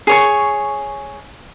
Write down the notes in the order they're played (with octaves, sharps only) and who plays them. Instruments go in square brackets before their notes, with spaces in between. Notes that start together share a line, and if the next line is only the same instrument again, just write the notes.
[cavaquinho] G#4 C#5 C#6